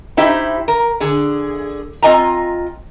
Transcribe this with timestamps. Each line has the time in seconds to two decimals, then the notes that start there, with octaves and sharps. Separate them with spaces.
0.17 D#4 E4 G4 C5
0.68 A#4
1.00 D3 G#4
2.02 C4 F4 D#5 G#5 A#5